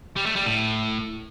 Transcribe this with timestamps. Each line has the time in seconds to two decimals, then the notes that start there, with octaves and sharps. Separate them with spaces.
0.16 G3
0.26 A3
0.36 G3
0.46 A2